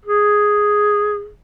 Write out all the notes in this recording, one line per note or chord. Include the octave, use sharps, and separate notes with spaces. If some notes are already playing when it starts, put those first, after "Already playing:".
G#4